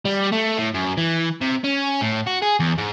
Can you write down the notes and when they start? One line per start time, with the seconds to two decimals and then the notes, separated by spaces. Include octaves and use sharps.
0.05 G3
0.32 A3
0.58 A2
0.74 F#2
0.97 E3
1.41 C3
1.64 C#4
2.01 A2
2.27 F#4
2.42 G#4
2.60 E2
2.78 G#2